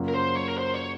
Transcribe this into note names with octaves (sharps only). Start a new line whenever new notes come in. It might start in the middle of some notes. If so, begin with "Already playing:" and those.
Already playing: F#2 C#3 F#3 A#3 F4
A#4
C5
C#5
A#4
C5
C#5